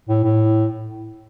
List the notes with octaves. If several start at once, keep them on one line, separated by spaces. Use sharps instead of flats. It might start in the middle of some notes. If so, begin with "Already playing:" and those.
A2
A2